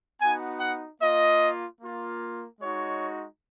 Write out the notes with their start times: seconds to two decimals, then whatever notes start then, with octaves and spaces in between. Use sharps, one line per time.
0.20 B3 D#4 F#4 G#5
0.60 F#5
1.00 A#3 F4 D#5
1.80 A#3 F4
2.60 G#3 D#4 F#4 C#5